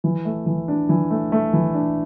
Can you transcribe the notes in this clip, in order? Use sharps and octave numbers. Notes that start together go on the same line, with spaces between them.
E3
A3
E3
D4
E3
A3
A3
E3
D4